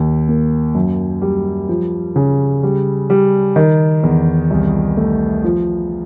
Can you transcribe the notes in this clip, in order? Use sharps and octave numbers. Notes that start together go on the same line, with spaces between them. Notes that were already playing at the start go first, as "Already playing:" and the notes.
Already playing: D#2
A#3
F#2
G3
F3
C#3
G3
G3
D#3
E2
C2
A3
F3